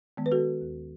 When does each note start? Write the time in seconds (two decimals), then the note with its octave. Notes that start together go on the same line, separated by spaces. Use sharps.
0.17 D#3 G#3 B3
0.26 B4
0.32 F#4 A4
0.61 D#2